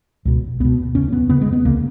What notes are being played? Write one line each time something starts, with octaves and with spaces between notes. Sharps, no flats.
C#2 B2
C#2 B2 B3
D#2 C#3 C#4
B3
D#2 C#3 B3
G#3
B3
C#2 C#3 A#3